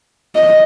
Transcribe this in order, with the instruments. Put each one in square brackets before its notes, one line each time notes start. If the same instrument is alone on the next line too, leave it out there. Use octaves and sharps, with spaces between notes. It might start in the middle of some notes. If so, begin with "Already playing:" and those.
[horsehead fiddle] D#5